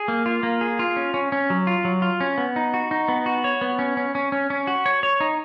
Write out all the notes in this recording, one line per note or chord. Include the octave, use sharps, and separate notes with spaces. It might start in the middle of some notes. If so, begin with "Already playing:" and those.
Already playing: G#4
A#3
F4
A#3
G#4
F4
C#4
C#4
C#4
F#3
F4
F#3
F4
C#4
B3
D#4
F#4
D#4
B3
F#4
C#5
B3
C#4
C#4
C#4
C#4
C#4
F#4
C#5
C#5
D#4